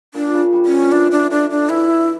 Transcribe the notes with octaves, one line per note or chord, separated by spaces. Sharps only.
A#2 D4
C#3
G3
C#4
F3
E3 D4
D4
D3 D4
D4
E3 E4